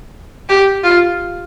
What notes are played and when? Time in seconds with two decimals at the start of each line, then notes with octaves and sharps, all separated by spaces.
0.49 G4
0.83 F4